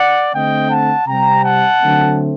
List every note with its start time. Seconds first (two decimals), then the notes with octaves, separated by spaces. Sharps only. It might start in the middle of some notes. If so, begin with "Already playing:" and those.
Already playing: D5 F#5
0.33 D3 A3 C4 D#5 G5
0.70 F#5 A5
1.07 C3 G3 C4 G5 A#5
1.44 F#5 A5
1.81 D3 F#3 A3 C4